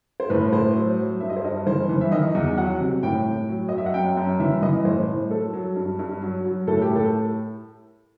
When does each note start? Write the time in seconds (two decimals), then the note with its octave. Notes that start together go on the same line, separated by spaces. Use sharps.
0.20 C5
0.30 A2 B4
0.53 A2 C5
0.75 F#3
0.98 F#3
1.20 G2 E5
1.30 D#5
1.36 C5
1.44 G2 D#5
1.67 E3 C5
1.89 E3
2.01 E5
2.12 D#3 D#5
2.35 E2
2.58 F#3 F#5
2.80 C3
3.03 A2 G5
3.26 A2
3.49 F#3
3.69 F#3 D#5
3.78 E5
3.86 F#5
3.94 F#2 G5
4.17 F#2
4.40 E3 E5
4.62 E3 D#5
4.85 A2 C5
5.07 A2
5.31 F#3 A4
5.53 F#3
5.76 G2
5.99 G2
6.22 F#3
6.44 F#3
6.67 A2 A4
6.82 G4
6.90 A2
6.95 A4